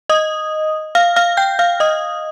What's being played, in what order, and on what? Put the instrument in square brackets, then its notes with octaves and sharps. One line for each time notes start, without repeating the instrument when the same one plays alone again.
[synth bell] D#5 D#6
F5 F6
F5 F6
G5 G6
F5 F6
D#5 D#6